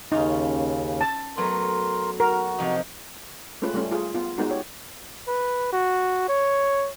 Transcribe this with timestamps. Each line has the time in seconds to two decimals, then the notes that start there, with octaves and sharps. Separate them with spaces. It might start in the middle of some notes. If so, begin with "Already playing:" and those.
0.12 D#2 C#3 C#4 D#4 F4
1.01 A5
1.37 F#3 A3 B3 A#4 C6
2.20 F#4 A#4
2.58 C3 F3 D#4
3.62 G#3 A3 C#4 F4 B4
3.74 G3 A3 C#4
3.91 F4 G#4
4.14 B3 F4
4.38 G#3 B3 D#4 F#4
4.50 G4 C#5
5.28 B4
5.73 F#4
6.29 C#5